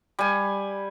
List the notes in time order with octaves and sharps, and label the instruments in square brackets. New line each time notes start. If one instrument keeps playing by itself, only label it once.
[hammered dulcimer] G3 G#5